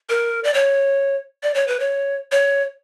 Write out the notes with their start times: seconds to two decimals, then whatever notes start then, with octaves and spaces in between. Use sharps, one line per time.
0.09 A#4
0.44 D5
0.54 C#5
1.43 D5
1.54 C#5
1.67 B4
1.80 C#5
2.32 C#5